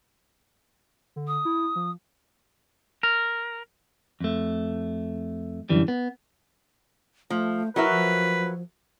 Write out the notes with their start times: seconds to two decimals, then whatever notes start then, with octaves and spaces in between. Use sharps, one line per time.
1.16 D3
1.28 D#6
1.45 E4
1.76 F3
3.03 A#4
4.21 F2 A3
5.69 F#2 D3 E3 G3
5.88 B3
7.30 F3 A3
7.76 F#3 E4 A#4 B4 E5
7.91 F3